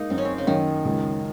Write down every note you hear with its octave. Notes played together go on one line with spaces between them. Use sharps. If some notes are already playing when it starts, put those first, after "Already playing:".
Already playing: G#3 A#3 D#4
F#2 C4
C#4
C4
C#3
F#2 D#3
C#2